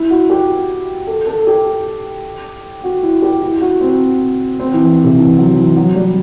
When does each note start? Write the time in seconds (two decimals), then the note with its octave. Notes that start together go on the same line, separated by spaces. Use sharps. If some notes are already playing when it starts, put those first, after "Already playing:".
Already playing: E4
0.10 F#4
0.30 G4
1.07 A4
1.26 A4
1.47 G4
2.84 F#4
3.03 E4
3.22 G4
3.42 E4
3.61 F#4
3.81 C4
4.60 C4
4.73 E3
5.04 C3
5.17 E3
5.38 F#3
5.57 E3
5.76 F#3
5.95 G3